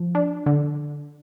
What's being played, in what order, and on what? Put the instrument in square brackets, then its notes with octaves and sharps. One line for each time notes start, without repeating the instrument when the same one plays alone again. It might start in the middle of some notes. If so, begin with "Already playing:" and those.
Already playing: [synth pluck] F3
D4
D3